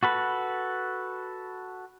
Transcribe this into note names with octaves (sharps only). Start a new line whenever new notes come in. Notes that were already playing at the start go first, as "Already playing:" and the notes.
F#4 A4 B4